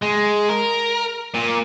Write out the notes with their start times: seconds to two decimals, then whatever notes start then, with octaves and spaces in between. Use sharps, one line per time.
0.03 G#3
0.49 A#4
1.34 A#2